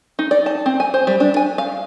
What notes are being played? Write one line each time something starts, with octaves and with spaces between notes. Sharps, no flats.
D#4
D5
A5
C4
G#5
C5
G3
D4
G#5
F5